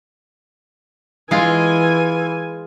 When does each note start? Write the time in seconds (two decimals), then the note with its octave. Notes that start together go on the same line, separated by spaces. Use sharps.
1.31 E3 G#3 F4 G#5